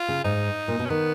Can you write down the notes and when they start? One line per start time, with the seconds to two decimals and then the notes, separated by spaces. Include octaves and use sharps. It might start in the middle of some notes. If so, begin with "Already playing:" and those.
Already playing: F4
0.08 C#3
0.24 G#2 D#4
0.68 A#2
0.79 B2
0.85 C#4
0.90 D#3 B3